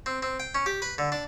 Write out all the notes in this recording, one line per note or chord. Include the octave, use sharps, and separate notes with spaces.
C4
C4
G5
C#4
G4
B4
D3
D4